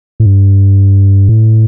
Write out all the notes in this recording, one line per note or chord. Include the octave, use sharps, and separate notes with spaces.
A2
G2
A2